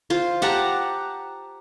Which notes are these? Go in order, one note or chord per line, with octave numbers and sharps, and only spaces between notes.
F4 C5
G4 F#5 A5 A#5